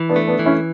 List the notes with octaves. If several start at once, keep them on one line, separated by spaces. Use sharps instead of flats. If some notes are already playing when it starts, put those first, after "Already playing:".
Already playing: E3
B3 D4
A3
B3 D4
E3
C#4 E4